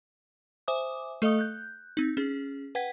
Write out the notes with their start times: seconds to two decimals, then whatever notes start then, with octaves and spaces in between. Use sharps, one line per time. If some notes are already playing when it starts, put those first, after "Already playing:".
0.68 C5 E5 G#5 D6 D#6
1.22 A3 A4 D#5 F5 D#6
1.39 F#6 G6
1.97 C4 D#4
2.17 C#4 G#4
2.75 B4 F#5 G5 G#6 B6